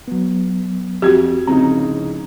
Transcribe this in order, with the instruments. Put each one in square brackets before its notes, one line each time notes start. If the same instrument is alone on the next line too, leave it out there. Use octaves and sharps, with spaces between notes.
[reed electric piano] F#3 B3
[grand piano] F2 G#6 [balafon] F#4 G4
[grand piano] D1 C#3 D#4 [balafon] C4 [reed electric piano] A#5